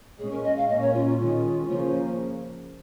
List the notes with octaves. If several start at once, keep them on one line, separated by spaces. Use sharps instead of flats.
A#2 G#3 C#4 G#4
A#4
D#5
F5
A#2 A#3 C#4 D#5
C#5
F4
F4
D#3 G#3 C#4
C#3 F3 A#3 C#4 F4